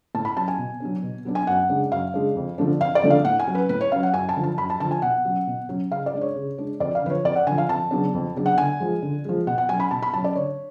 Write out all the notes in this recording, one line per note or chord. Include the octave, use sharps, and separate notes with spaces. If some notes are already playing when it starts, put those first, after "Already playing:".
A2 A5
B5
F#3 C#4 A5
G#5
B2
F#3 B3 D4
B2
F#3 B3 D4
G#5
F#2 F#5
C#3 G#3 D4
F#2 F5
C#3 G#3 D4
F2
D3 F3 A3 D4
F2 F5
D5
D3 F3 A3 D4
F5
A2 F#5
G#5
F#3 C#4
B4
A2 B4
C#5
F#3 C#4 F5
F#5
F#2 G#5
A5
D3 F3
A5
F#2 B5
A5
D3 F3 A5
G#5
B2 F#5
F#3 C#4
B2
F#3 C#4
C#3 F5
D5
G#3 D4
C#5
C#3
G#3 D4
F2 D5
F5
D3 F3 B4
C#5
F2 D5
F#5
D3 F3 G#5
F5
F2 A5
C#3 F#3 B3 D4
F2
C#3 F#3 B3 D4
F#5
D3 G#5
F3 G#3
D3
F3 G#3
B2 F#5
F#5
F#3 C#4 G#5
B5
B2 A5
B5
F#3 C#4 A5
D5
D3 C#5